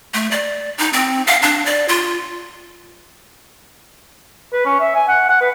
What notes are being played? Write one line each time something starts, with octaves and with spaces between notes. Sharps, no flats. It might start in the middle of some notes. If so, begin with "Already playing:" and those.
A3
D5
D#4
C4
F5
D4
D5
F4
B4
C#4
E5
G#5
F#5
F#5
B4